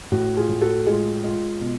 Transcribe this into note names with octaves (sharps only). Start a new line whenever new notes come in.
A2 F#4
F4 G#4
A2
F#4 A4
G#3 F4 G#4
G#3 F4
B2